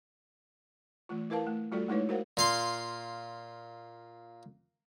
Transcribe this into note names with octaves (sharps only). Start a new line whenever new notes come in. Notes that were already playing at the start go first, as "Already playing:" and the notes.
E3 A3 F4
E4 A#4 B4 F5 A5
A3
G3 A3 F4 F#4 A4 D5
G#3 A3 D#4 E4 B4 C#5
F#4 A#4 C5 F5 F#5
A#2 F5 C6